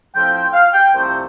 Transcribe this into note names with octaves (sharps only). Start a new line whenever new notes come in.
A2 F3 C4 F4 G5
G5
F5
G5
C2 C3 F3 A3 C5